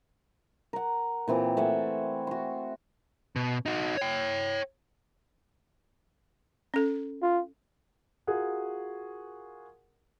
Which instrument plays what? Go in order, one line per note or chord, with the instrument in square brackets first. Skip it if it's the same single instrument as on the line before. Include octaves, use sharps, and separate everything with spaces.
[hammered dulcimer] A#4 F#5
A#2 E3 C4 G4
A3 E5 F#5 G#5
F#4 C6
[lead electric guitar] B2
D#4 F#4
C#5 G5
[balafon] C#4 A4
[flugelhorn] F4
[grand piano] F4 F#4 G#4 A#4 F#5